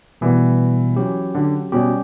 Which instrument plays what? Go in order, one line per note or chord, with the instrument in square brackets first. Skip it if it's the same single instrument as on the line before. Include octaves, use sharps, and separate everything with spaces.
[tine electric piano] B2 G3 B3 [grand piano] E3
[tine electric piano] F#3 C#4 G4
[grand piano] D3
[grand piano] B2 [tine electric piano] G3 C#4 G4